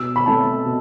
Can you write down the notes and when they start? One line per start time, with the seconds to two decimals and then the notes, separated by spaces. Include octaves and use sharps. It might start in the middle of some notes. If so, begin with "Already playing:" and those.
Already playing: B2 E6
0.16 B5
0.26 A3 C4 A5
0.66 B2